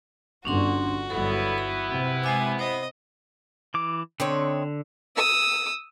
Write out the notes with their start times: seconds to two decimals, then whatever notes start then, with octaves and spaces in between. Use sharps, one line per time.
0.45 G1 D3 C#4 D4 F#4 C6
1.10 G1 F#3 B3 E4 A4
1.58 B5
1.91 C3
2.24 G#3 E5 G#5 D6
2.59 C5 D#5
3.74 E3 D6
4.20 D3 C4 D#4 C#5
5.16 D#6 E6